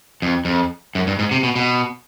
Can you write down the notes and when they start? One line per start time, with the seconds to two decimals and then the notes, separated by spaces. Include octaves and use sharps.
0.22 F2
0.45 F2
0.95 F#2
1.07 G2
1.19 G#2
1.31 C3
1.43 B2
1.56 B2